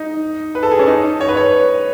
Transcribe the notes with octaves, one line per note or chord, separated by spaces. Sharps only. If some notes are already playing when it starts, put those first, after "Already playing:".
Already playing: D#4
B4
A4
G#4
C#4
D#4
C#5
B4
C#5